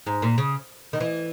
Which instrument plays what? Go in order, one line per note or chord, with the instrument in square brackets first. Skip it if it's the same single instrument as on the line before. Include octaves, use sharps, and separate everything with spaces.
[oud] G#2
A#2
C#3
D#3
E3